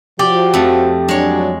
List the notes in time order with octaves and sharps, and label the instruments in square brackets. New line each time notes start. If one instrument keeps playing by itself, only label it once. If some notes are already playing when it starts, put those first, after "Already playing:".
[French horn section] F3 F#4 [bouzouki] G4 [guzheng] D5
[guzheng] F2 A3
[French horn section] F#3 D4 [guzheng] G#3 C#5